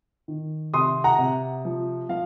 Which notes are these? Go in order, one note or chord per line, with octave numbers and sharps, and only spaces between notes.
D#3
C3 C6 D#6
F#5 A#5
C3
F3
F3 F5